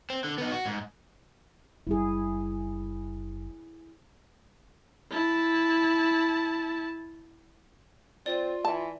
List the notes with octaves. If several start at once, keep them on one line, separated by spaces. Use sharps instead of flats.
C4
D3
B3 D#4
F#4
G#2
F#1 G3 E4 G#4
E4 A5
C4 F4 D5
E3 A5